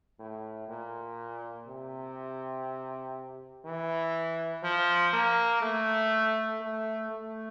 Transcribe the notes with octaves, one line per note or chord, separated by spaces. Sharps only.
A2
A#2
C3
E3
F3
A#3
A3
A3
A3